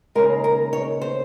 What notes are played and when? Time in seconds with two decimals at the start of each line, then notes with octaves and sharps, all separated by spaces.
0.15 D#2 C#3 G#3 A#4
0.44 A#4
0.73 C#5
1.02 C5